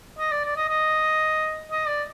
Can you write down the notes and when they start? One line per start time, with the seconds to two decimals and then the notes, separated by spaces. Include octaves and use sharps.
0.19 D#5
0.32 D5
0.45 D5
0.57 D#5
0.69 D#5
1.71 D#5
1.87 D5